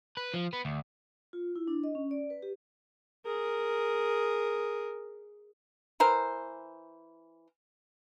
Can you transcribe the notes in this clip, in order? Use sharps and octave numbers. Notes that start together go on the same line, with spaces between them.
B4
F3
B3
D2
F4
E4
D4
D#5
C#4
D5
B4
G4
G#4 A#4
E3 A#4 C5